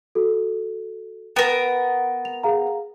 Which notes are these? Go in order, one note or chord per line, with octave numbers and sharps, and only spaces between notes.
F#4 A4
B3 A#4 G5 D7 E7
F7
G#4 F5 A#5